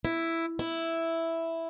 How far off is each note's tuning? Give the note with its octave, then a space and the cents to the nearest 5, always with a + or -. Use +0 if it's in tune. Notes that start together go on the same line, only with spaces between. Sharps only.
E4 +5
E4 +0